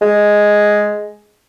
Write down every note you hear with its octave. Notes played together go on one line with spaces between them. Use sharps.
G#3